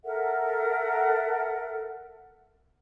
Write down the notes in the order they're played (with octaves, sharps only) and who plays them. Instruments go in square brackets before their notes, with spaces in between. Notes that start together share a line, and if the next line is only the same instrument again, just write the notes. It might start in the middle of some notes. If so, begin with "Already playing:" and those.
[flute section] A4 A#4 E5 F#5